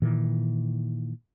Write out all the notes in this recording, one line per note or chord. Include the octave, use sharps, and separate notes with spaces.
A#2 D#3 E3